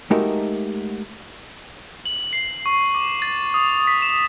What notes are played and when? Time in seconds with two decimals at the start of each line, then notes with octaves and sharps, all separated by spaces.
0.11 G#3 A3 D#4 F#4 G4 A#4
2.06 F#7
2.33 C7
2.66 C#6
2.95 D6
3.22 A6
3.54 D#6
3.87 B6
4.02 E7